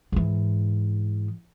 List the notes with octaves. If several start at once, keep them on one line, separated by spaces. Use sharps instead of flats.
G#2 E3